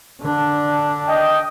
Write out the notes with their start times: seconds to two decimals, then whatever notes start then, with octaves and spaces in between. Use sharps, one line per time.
0.21 D3 D4
1.08 D#5 G5